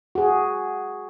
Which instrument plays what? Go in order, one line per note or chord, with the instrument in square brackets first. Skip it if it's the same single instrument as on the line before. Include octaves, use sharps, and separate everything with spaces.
[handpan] F#4 G#4